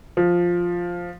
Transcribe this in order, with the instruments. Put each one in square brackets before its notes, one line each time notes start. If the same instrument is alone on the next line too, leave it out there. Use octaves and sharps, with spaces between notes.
[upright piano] F3